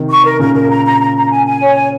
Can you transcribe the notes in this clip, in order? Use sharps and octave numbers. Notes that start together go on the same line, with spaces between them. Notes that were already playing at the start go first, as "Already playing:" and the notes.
Already playing: C3 D#3
C#6
A#4
A#2 C#3 A#4
A#4
A#5
A#5
A#5
A#5
G#5
G#5
C#5
G#5